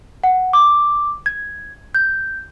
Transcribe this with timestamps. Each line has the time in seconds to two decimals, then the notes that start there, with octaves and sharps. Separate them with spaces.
0.24 F#5
0.53 D6
1.26 G#6
1.95 G6